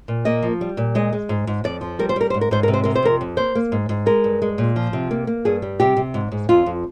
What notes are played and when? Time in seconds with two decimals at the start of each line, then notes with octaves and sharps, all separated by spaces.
0.08 A#2
0.25 A#3 D#5
0.42 F3
0.61 G3
0.77 A#2
0.95 G#3 D#5
1.12 G#3
1.29 G#2
1.47 G#2
1.64 F2 D5
1.81 F3
1.99 G3 A#4
2.09 C5
2.16 G3 A#4
2.30 G#2 C5
2.41 A#4
2.51 G#2 C5
2.63 C3 A#4
2.74 C5
2.84 C3 A#4
2.95 C5
3.02 F2 A#4
3.21 F2
3.37 A#3 C5
3.55 A#3
3.72 G#2
3.89 G#2
4.06 G#3 A#4
4.24 G2
4.42 G#3
4.58 A#2
4.76 F3
4.93 C3
5.11 A#3
5.27 A#3
5.45 G2 G#4
5.62 G3
5.80 C3 G4
5.97 C3
6.14 G#2
6.32 G#2
6.49 F2 F4
6.66 F2